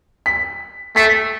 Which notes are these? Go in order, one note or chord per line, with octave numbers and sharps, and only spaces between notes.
B6
A3 B6